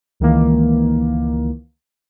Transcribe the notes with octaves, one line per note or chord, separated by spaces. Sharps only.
C#2 D#3 E3 A#3